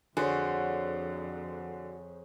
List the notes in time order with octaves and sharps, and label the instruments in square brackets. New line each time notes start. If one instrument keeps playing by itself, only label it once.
[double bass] F2 [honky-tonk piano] D3 [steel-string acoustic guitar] F#4 [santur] G#4 C5 C#5